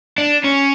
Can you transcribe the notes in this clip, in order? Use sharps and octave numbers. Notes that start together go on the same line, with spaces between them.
D4
C#4